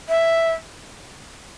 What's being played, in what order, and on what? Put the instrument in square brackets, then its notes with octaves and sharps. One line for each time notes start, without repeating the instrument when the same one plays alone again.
[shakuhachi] E5